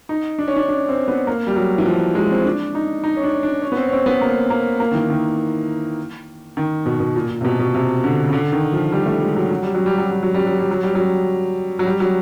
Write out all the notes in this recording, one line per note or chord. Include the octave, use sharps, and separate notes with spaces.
D#4
D4
C#4
D4
D4
C4
B3
A#3
G3
F#3
E3
F3
G#3
C4
D4
D#4
D#4
C#4
D4
D4
C#4
B3
C4
C#4
C4
B3
A#3
A#3
A#3
D#3
E3
D#3
D#3
B2
B2
A#2
A#2
C3
B2
B2
C3
D3
C#3
D3
D#3
F3
G3
A3
G#3
F#3
F#3
G3
F#3
G3
F#3
G3
F#3
G3
F#3
G3
F#3
G3
F#3
F#3
G3
F#3